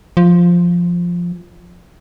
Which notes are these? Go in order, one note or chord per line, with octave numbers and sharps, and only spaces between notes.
F3